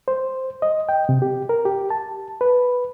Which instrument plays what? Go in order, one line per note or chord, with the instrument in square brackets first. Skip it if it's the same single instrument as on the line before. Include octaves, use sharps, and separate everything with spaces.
[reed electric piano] C5
D#5
G5
C3
G4
A#4
G4
A5
B4